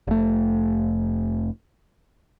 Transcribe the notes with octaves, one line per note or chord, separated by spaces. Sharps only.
F1 A3